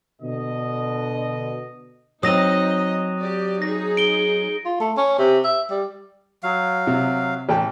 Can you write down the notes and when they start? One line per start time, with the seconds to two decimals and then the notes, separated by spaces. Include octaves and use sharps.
0.22 B2 D3 D#5
2.23 F#3 C4 D#4 D#5 D#6 A#6 D#7
3.19 G4 D5
3.62 D#4 G#4 A#6
3.97 D7 G7
4.65 F4
4.80 A3
4.97 C#4
5.19 C3
5.44 E5
5.71 G3
6.43 F#3 F5
6.87 C3
7.49 A1 G5 A5